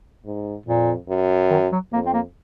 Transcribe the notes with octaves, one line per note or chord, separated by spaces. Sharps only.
G#2
F2 A#2
F#2
D#3
F#3
F2 A#3
C4
A#3